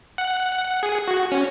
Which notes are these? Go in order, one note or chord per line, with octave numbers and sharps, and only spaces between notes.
F#5
G#4
F#4
C#4